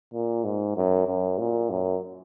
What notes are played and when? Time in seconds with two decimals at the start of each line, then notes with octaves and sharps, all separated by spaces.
0.14 A#2
0.44 G#2
0.77 F#2
1.07 F#2
1.39 A#2
1.70 F#2